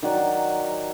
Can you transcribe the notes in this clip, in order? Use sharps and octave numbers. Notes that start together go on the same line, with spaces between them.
D#3 F#3 D5 F#5